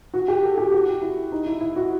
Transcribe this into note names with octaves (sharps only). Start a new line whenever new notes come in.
F#4
G4
A4
G4
F#4
E4
E4
D#4
E4
E4
F#4